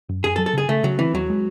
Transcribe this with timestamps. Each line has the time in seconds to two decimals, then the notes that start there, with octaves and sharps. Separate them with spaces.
0.09 F#2
0.24 F#2 G#4
0.36 A4
0.38 F#3
0.46 A4
0.53 C#3 G#4
0.69 C#3 A3
0.83 C#3 F#3
0.98 E3 C4
1.14 D#2 F#3
1.30 G#3